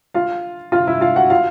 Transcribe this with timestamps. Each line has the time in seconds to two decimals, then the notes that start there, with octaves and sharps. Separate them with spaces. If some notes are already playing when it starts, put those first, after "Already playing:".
0.14 F4 F5
0.72 F4 F5
0.87 E4 E5
1.01 F4 F5
1.16 F#4 F#5
1.30 F4 F5